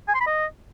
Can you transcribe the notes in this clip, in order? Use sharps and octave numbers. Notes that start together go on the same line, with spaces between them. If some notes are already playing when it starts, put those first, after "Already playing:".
G#5
C6
B5
D#5